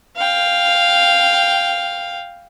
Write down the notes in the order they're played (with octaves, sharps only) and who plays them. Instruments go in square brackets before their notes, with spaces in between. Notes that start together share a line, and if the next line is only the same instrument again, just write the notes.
[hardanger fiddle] F5 G5